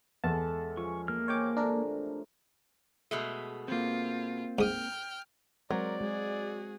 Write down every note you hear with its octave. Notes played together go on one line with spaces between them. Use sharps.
E2 G#3 A4 A5
F3 C#4 C#6
A#3 F6
F3 G#3 C#4 C#5 G5 D6
A2 C3 D4 A#4
B2 G#3 A3
A#3 C4 F4
G#2 G5 D#6 F6
F#3 G#3 C4 A#4 C5 D5
G#3 F#4 G#4